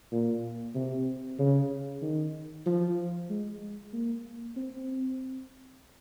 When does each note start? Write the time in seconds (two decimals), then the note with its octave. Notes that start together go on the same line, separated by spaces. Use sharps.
0.12 A#2
0.75 C3
1.39 C#3
2.02 D#3
2.66 F3
3.30 G#3
3.93 A#3
4.56 C4